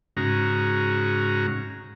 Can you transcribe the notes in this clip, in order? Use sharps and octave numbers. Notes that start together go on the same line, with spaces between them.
G#2 C#3 F#4 A#5